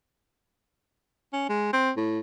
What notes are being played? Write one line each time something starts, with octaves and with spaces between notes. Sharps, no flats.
C#4
G#3
C4
A2